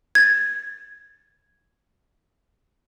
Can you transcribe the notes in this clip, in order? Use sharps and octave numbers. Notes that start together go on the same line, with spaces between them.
G#6 A6